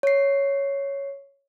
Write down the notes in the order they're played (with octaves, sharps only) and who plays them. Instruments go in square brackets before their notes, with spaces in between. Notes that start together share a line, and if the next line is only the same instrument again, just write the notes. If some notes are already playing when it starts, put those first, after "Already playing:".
[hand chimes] C#5 C7